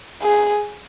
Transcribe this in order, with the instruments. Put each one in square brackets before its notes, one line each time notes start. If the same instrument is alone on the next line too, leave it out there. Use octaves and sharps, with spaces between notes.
[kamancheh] G#4